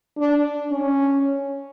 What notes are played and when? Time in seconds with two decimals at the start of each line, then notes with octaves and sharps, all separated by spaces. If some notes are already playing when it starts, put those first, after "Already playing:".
0.18 D4
0.72 C#4